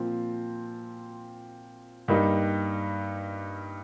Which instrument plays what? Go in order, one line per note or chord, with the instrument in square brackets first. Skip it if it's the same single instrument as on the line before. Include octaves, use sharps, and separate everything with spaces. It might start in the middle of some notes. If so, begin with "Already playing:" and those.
Already playing: [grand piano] A#2 F3 C4 F4
G2 G3 A#3 D#4